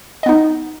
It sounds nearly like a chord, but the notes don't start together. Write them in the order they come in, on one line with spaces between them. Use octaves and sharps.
D#5 B3 D#4